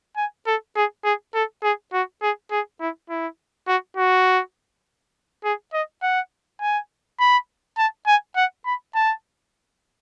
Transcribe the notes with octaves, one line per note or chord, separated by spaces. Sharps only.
G#5
A4
G#4
G#4
A4
G#4
F#4
G#4
G#4
E4
E4
F#4
F#4
G#4
D#5
F#5
G#5
B5
A5
G#5
F#5
B5
A5